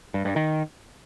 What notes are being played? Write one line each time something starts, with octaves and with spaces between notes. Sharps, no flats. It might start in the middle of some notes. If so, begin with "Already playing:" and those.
G2
G2
D#3